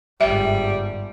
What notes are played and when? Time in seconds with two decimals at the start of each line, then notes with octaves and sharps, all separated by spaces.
0.21 G1 G#2 G3 E5